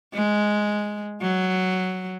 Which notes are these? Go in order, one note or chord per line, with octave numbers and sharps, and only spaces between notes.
G#3
F#3